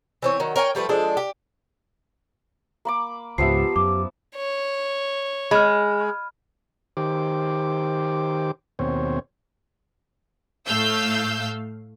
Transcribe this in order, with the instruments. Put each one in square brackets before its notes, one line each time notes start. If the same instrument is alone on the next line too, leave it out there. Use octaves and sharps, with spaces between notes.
[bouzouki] E3 C4 C#5
D#3 F#3
A#4 C#5 G5 G#5
F3 G3 A3 B4
F3 G#3 D4 A4
G4
[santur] A#3 B5 D6
[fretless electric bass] C#2 G#2 [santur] F3 B3 E5 [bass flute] G4 [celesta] C7
[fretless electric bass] F#2 [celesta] D6
[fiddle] C#5
[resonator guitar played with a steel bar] G#3 [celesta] B5 F6
[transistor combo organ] D#3 G4 C5 D6
D#2 B2 C4 C5 C#5
[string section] A2 A3 F5 E6 G6